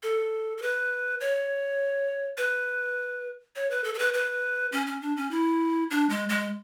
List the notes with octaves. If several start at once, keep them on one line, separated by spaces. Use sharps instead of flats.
A4
A4
B4
C#5
B4
C#5
B4
A4
A4
B4
B4
C#4
C#4
D4
C#4
E4
D4
G#3
G#3